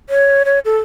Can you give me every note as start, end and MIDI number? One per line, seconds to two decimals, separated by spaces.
0.09 0.43 73
0.45 0.59 73
0.65 0.79 69